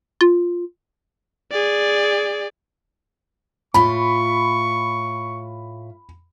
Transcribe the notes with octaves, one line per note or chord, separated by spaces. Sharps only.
F4
G#4 D5
A2 F4 B5 C#6